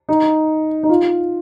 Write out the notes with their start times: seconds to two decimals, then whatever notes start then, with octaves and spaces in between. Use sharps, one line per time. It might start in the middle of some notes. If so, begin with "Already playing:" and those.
0.09 D#4
0.83 D#4
0.89 F4